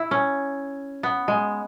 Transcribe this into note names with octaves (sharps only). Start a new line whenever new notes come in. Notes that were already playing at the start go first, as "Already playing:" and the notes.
Already playing: E4
C#4
B3
G#3